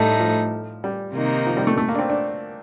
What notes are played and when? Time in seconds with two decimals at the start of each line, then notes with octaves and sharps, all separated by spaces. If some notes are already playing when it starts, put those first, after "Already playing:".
Already playing: A2 G3 A3 D#4
0.20 F3
0.84 G3
1.15 C3 D#3 A#3 D#4
1.47 F3
1.57 G3
1.67 A3
1.78 A3
1.89 A#3
1.95 D4
1.99 C4
2.10 D4